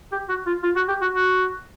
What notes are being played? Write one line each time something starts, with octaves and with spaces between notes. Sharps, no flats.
G4
F#4
F4
F4
F#4
G4
F#4
F#4